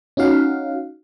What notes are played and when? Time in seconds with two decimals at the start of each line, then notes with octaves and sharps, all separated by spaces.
0.17 C#4 D#4 F#4 F5 F#5